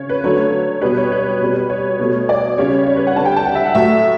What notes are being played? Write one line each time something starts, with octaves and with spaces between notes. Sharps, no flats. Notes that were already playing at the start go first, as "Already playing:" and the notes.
Already playing: C#3 C#5
B4
D3 F#3 A3 C#5
B2 G3 B4
C#5
B4
B2 G3
C#5
B2 A3
D5
C#3 G3 C#5
C#5
B4
F#5
D3 G3 A5
G5
A5
F#5
E5
F#5
A2 F#3 A3 E5